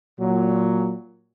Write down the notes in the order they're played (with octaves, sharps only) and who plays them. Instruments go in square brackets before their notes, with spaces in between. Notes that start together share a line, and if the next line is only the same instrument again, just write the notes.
[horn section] A#2 F#3